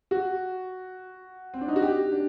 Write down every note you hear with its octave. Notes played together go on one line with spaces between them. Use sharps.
F#4
C4
D4
D#4
F#4
G4
D4